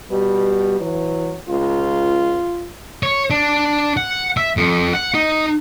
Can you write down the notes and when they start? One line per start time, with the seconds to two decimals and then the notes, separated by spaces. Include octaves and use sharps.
0.11 B2 G3
0.80 E3 F#3
1.49 C#2 F4
3.03 C#5
3.30 D4
3.97 F#5
4.37 E5
4.57 F2
4.93 F#5
5.14 D#4